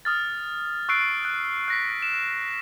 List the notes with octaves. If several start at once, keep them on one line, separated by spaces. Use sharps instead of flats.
D#6 F6 A6
C#6 E6 F#6 C7 D7
F#6
F#6 A#6 B6
E7